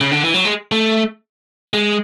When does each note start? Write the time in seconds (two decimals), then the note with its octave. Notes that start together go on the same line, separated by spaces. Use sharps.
0.01 C#3
0.12 D3
0.24 E3
0.34 F#3
0.45 G#3
0.72 A3
1.74 G#3